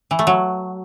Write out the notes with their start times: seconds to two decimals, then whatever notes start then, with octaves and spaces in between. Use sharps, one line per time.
0.11 E3
0.19 A3
0.27 F#3